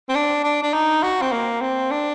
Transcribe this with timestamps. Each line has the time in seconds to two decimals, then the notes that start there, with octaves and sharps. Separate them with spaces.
0.09 C4
0.15 D4
0.43 D4
0.63 D4
0.74 D#4
1.03 F#4
1.22 C4
1.32 A#3
1.61 C4
1.91 D4